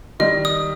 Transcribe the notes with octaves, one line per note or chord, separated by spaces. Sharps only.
D#3 G3 D#5
D#6